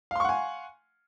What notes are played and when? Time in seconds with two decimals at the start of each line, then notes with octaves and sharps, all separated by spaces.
0.11 F5
0.15 C6
0.20 C#6
0.24 F#5
0.29 G#5